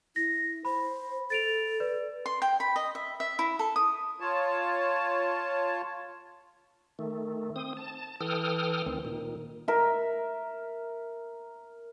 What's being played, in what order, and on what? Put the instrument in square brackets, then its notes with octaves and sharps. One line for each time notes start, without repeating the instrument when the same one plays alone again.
[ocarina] E4 [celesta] A#6
[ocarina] C5 [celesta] B5
[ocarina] A4 [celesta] A6 D7 F7
[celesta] B4 D5
[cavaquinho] C6
G5
B5
D#5
E5
E5
E4
A4
D#6
[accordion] F4 C#5 A5
[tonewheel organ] D#3 A3
C4 D#6
A5
E3 A4 G5 D#6 F6
D2 D#3 C4
A#2 D#3
[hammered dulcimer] A#4 E5